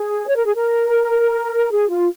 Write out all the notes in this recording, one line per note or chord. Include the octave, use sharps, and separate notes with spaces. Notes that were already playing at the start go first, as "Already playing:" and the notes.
Already playing: G#4
C#5
A#4
G#4
A#4
G#4
F4